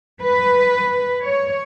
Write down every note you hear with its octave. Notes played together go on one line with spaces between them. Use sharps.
B4
C#5